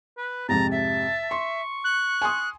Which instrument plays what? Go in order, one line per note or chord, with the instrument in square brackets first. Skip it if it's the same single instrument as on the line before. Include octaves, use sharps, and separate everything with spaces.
[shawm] B4
[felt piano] F2 G#2 C3 [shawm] A5 [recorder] A#5
[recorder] E5 [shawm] A5
[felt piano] C6 [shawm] C#6
[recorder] F#6
[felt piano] G#5 C6 D#6